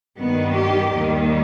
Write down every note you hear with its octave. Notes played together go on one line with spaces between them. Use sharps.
G2 D#3 G3 B3
G4
D#2 D#3 G3